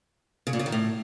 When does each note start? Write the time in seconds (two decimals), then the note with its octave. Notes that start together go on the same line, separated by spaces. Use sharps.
0.47 C#3
0.53 A#2
0.59 C#3
0.66 D#3
0.72 A2